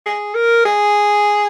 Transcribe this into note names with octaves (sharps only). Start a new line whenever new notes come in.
G#4
A#4
G#4